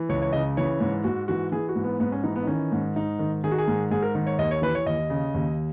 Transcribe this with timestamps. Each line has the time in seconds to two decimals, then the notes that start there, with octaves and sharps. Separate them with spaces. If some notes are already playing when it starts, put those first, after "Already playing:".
Already playing: E3
0.09 C#2 C#5
0.22 C#5
0.33 C#3 D#5
0.57 E3 C#5
0.80 G#2
1.04 G#2 F#4
1.28 E3 F#4
1.52 E3 G#4
1.69 F#4
1.76 G#2
1.84 B3
2.00 G#2 B3
2.12 C#4
2.23 E3 D#4
2.36 B3
2.43 D#4
2.47 D#3 C#4
2.72 G#2
2.96 G#2 D#4
3.19 D#3
3.44 D#3 G#4
3.51 F#4
3.58 G#4
3.68 G#2
3.91 G#2 G#4
4.02 A#4
4.15 D#3
4.27 C#5
4.38 D#2 D#5
4.51 C#5
4.62 E3 B4
4.75 C#5
4.86 D#2 D#5
5.10 C#3
5.34 D#2